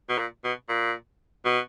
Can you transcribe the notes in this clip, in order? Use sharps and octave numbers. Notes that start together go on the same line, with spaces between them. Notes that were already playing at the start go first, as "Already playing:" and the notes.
B2
A#2
B2
A#2
B2